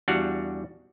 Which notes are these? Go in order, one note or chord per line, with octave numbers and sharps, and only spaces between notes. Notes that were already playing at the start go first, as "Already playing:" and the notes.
E2 G3 D4 F#4 F5 F#5